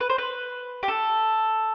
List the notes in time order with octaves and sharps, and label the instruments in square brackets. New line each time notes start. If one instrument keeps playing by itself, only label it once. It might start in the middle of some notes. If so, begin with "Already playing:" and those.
[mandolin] B4
C5
B4
G4
A4